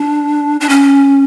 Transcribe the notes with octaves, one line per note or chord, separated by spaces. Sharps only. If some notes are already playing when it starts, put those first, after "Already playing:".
Already playing: D4
D4
C#4